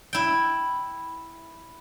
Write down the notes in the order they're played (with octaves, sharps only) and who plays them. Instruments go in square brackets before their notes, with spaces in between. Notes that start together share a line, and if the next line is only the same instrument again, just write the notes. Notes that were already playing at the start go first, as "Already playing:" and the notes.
[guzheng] E4 G5